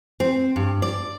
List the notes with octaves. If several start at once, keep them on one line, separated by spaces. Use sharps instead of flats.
C4
G2
D5